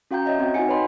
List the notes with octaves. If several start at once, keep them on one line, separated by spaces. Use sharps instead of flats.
C#4 F#4 F5 G5 A#5 G6
C#5 D#5 E5
C4 F#4 G5 G#6
D#4 F4 F#4 F#5 G#5 C#7
F#4 B4 C#5 D#5 B5 C6